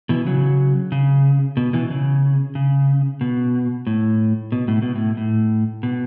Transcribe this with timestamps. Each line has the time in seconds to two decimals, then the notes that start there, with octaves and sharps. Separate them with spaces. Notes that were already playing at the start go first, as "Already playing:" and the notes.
0.09 B2 E3
0.26 C#3 F#3
0.92 C#3
1.57 B2
1.73 B2 E3
1.90 C#3
2.55 C#3
3.21 B2
3.87 A2
4.52 B2
4.68 A2
4.82 B2
4.96 A2
5.17 A2
5.83 B2